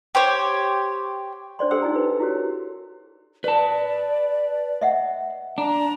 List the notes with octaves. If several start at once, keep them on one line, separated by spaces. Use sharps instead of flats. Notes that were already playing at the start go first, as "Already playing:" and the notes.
G4 C5 C#5
D4 C5 D5 C6
G4 A4 C5 G5 C6 E6
D#4 F4 D5 G#5 A#5
B4
E4 F#4 G4 C#5
A#4
B4 D5 A5
D#5 E5 F#5
D4 A#5